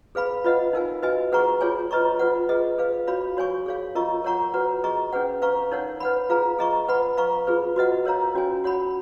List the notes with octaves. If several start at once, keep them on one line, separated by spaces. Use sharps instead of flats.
G#4 B4 F5 B5
F4 B4 D#5 F#5
D#4 A#4 F5 G#5
F#4 B4 D#5 G#5
G#4 B4 F#5 A#5 C#6
F4 G#4 C#5 G#5
F4 B4 D#5 A#5 C#6
F4 B4 F#5
G#4 B4 D#5
G#4 B4 F5
F#4 C#5 F5 B5
F#4 C#5 G#5 C#6
G#4 C#5 F5
F4 A#4 D#5 A#5 C#6
A#4 C#5 F#5 A#5 C#6
F#4 B4 F#5 A#5
G#4 D#5 A#5 C#6
C#4 G#4 B4 F#5
B4 F5 A#5 C#6
D#4 A#4 C#5 F#5
B4 F#5 B5
F4 G#4 B4 F5 A#5
G#4 D#5 A#5 C#6
B4 F#5 B5
B4 F5 A#5 C#6
F4 G#4 B4
F#4 B4 D#5 F#5
A#4 C#5 F5 A#5
C#4 F#4 C#5 G#5
F#4 C#5 F#5 B5